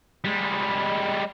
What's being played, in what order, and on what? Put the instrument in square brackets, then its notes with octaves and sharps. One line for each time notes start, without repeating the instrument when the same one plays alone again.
[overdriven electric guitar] G3 G#3